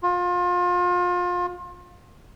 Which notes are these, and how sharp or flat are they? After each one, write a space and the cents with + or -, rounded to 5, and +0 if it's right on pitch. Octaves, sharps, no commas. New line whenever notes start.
F4 +30